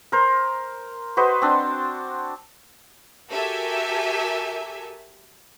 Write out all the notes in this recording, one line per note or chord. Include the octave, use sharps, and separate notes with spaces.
A#4 C5
F#4 B4 C5 D#5
C4 D4
F#4 G4 A4 A#4 E5 G#5